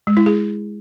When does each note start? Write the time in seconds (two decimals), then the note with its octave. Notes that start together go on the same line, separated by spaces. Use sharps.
0.07 G#3
0.17 E4
0.26 G#4